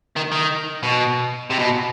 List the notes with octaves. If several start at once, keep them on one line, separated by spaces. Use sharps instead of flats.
D#3
D#3
B2
C3
B2